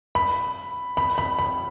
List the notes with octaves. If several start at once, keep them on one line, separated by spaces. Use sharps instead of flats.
B5
B5
B5
B5